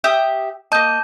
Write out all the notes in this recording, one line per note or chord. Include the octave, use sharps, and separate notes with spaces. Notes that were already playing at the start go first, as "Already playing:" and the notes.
G4 E5 D#6
A#3 D#5 A5 G6